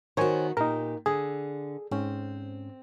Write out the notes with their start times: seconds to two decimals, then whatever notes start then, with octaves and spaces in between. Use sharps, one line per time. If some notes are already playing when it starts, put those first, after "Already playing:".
0.17 D#3 B3 F#4 C5 C#5 G#5
0.57 A#2 D#4 G4 A#4
1.06 D3 G#4
1.91 G#2 C4 C#4